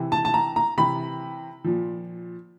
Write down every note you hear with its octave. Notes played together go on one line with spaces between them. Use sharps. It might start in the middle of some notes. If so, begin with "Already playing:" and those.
Already playing: C3 E3
A5
A5
A#5
A#5
C3 E3 B5
A#2 F3